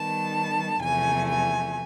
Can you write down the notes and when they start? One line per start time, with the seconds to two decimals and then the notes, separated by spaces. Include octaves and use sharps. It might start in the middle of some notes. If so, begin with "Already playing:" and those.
Already playing: D#3 G3 B3 A5
0.81 E2 C3 F3 A3 G#5
1.27 G#5